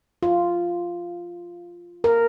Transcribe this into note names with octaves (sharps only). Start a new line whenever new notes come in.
F4
A#4